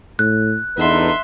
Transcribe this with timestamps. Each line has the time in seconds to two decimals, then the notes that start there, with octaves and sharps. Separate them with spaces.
0.19 A2 F#6
0.77 E2 D3 D#4 B4 E5 C6